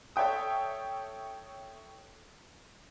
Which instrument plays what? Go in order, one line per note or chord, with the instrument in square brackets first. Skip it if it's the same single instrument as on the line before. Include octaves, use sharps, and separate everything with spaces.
[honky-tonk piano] A4 C#5 E5 G5 D#6